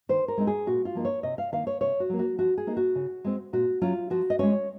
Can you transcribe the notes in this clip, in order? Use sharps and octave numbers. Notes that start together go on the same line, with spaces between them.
D#3 C5
A#4
G#3 C4 D#4
G#4
A#2 F#4
F4
F3 A#3 D#4
C#5
C3 D#5
F5
D#3 A#3 D#4 F5
C#5
C3 C#5
F#4
F#3 A#3
F#4
F3 F#4
G#4
A#3 D#4
F#4
C#3
G#3 C4
A#2 F#4
F#3 C#4 F4
F3 F#4
D#5
G#3 C#4 C#5